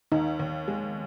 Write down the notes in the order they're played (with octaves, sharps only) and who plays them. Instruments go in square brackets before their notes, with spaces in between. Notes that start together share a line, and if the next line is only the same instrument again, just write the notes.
[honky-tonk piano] D#2 [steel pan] D#4
[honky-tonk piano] D#2
G#3